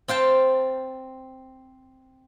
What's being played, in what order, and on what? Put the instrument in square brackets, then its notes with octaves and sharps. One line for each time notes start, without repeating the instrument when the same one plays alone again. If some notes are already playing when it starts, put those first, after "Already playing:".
[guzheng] C4 F5 G5 A5